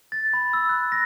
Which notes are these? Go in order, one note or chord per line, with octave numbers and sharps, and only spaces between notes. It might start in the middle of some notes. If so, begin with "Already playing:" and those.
A6
B5
E6
F#6
A#6